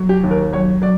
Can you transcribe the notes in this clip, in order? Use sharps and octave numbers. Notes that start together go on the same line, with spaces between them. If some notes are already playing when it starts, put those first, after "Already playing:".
Already playing: F#3
G4
D#2
A#4
F#3 C#5
F#3 D5